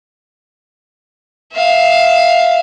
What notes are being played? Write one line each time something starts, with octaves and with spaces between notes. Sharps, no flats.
E5 F5